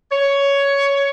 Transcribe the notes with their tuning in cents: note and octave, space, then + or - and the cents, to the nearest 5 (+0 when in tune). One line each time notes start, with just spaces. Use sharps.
C#5 +10